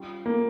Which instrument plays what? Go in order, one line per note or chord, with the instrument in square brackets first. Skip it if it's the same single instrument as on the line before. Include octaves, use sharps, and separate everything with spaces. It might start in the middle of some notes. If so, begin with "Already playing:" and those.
Already playing: [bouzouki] G3 C#4 F4
[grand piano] A#3